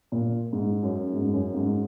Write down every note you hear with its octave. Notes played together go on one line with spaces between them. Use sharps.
A#2
G#2
F#2
G#2
F#2
G#2